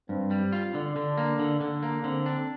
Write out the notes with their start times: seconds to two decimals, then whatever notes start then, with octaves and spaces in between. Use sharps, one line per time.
0.09 G2 C4
0.31 G3
0.53 F4
0.74 D3 D4
0.96 D3
1.18 A#3
1.39 D3
1.61 D3
1.83 A#3
2.04 D3 C4
2.26 D4